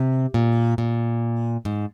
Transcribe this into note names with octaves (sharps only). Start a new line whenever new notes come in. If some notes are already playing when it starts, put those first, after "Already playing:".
Already playing: C3
A#2
A#2
G#2